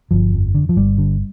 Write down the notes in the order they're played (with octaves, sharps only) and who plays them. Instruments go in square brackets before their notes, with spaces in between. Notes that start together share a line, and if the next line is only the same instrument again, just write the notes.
[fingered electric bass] G1 F3
F2
D3
F3
G1 G3
D3